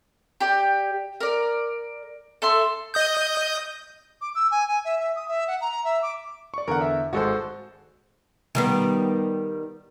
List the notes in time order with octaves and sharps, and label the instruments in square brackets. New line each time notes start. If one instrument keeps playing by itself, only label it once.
[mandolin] G4 D5
A#4 D5
A4 E5 C6
[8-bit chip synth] D#5 D#6 G6
[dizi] D6
E6
G#5
G#5
E5
E5
D#6
E5
F#5
A#5
E5
D6
[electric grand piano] D5 C#6
[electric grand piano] E2 D3 [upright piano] A#4 F#5
[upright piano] E5
[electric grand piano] G#1 G#3 [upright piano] F#4 A4 C5
[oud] D#3 G3 B3